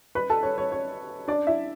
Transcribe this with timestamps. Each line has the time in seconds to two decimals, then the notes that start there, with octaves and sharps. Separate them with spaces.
0.15 B4 B5
0.30 A4 A5
0.43 C#5
0.58 C#5
0.72 C#5
1.28 D4 D5
1.47 E4 E5